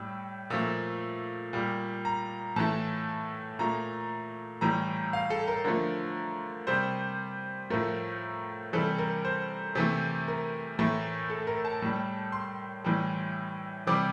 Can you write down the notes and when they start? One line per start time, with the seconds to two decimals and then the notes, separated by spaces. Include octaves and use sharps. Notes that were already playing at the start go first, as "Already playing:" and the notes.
Already playing: A2 G3 E6
0.50 A#2 F3 A3 E6
1.53 A#2 G3
2.05 A#5
2.56 A2 E3 A3 A5
3.59 A#2 A3 A#5
4.61 A2 E3 G3 A#5
5.13 F5
5.30 A4
5.47 A#4
5.64 D3 F3 A3 A#4
6.67 C3 G3 C5
7.70 A2 F3 A3 A#4
8.73 C3 E3 G3 A4
8.98 A#4
9.25 C5
9.75 C3 E3 A3
10.28 A#4
10.79 A2 E3 A3
11.30 A4
11.47 A#4
11.65 A5
11.82 A2 G3
12.32 C6
12.84 A2 E3 G3
13.87 C3 E3 G3 D6